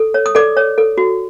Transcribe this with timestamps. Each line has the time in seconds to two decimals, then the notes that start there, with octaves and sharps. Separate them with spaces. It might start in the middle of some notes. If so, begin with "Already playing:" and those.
Already playing: A4
0.14 C#5
0.26 D#6
0.35 A4 D5 D6
0.57 C#5
0.78 A4
0.98 F#4